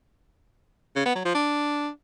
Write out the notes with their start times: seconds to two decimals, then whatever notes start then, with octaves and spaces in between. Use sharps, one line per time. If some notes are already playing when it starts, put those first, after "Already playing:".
0.96 C#3
1.06 B3
1.15 F#3
1.25 F3
1.35 D4